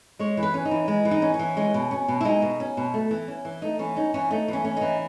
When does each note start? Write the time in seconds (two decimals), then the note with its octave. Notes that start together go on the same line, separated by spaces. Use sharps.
0.19 G#3 C#5
0.37 E3
0.43 B4
0.54 C#4
0.65 D#4
0.71 E3
0.88 G#3
1.05 E3
1.11 D#4
1.22 C#4
1.34 C#4
1.39 E3
1.57 G#3 C#4
1.74 B2
1.91 C#4
2.08 B2
2.21 E4
2.25 G#3 D#4
2.42 B2
2.60 C#4
2.77 B2
2.94 A3
3.11 E3
3.28 C#4
3.45 E3
3.62 A3 D#4
3.79 E3 C#4
3.96 C#4 D#4
4.14 E3 C#4
4.31 A3 D#4
4.48 E3 C#4
4.65 C#4
4.77 E3 D#4